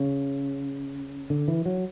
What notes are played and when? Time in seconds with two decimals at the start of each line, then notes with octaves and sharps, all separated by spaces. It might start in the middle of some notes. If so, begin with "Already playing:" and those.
Already playing: C#3
1.30 D3
1.48 E3
1.66 F#3